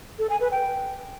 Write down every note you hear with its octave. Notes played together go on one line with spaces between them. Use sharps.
A4
G#5
B4
G5